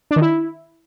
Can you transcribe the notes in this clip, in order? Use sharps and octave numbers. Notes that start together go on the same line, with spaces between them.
D4
D#3
E4